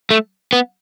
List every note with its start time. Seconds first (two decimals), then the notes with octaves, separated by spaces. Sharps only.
0.11 A3
0.53 B3